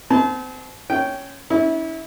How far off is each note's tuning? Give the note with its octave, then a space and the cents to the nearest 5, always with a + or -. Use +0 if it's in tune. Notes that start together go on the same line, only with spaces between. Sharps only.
C4 -30 A5 -40
C#4 +0 G5 -15
C#4 +30 E4 -25